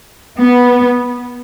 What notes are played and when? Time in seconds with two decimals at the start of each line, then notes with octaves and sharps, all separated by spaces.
0.39 B3